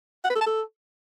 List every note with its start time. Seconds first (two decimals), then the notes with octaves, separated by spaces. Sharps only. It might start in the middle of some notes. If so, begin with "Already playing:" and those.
0.24 F#5
0.30 B4
0.35 A4
0.41 A5
0.46 A4